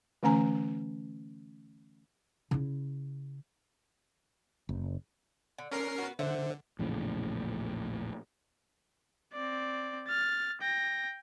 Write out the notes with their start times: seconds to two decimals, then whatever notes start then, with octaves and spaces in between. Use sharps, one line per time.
0.23 D3 E3 A3 C#4 G#5 A#5
2.51 C#3 E4
4.69 F#1
5.58 D3
5.72 D3 C#4 D4 A#4 C7
5.98 B3 F#4
6.19 D3 C5 E5 F#5
6.79 A#1 E2 A2 C#3
9.33 C4 D5
10.08 F6 A6
10.61 G5 A#6